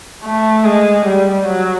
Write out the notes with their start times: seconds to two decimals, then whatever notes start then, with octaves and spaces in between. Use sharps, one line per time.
0.24 A3
0.65 G#3
1.06 G3
1.47 F#3